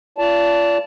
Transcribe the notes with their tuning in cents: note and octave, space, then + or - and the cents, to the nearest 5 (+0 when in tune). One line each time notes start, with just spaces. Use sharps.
F4 -30 D5 -30 A5 +0